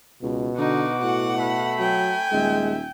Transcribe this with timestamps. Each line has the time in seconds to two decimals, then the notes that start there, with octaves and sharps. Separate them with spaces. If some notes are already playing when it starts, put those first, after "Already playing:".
0.23 C#2 B2
0.58 D3 D#4 F#4 D6
1.02 A2 F#5
1.39 A3 B5
1.79 F#3 G5 G#5
2.32 D#1 G#3 E5